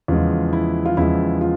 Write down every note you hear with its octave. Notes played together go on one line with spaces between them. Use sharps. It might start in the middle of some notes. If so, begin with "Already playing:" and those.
E2 C#3 F3 G#3 F4
E4
F4
E2 C#3 F3 G#3 E4
F4